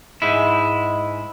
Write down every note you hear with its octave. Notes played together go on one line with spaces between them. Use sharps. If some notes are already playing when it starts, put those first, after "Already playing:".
G#2 G#3 E4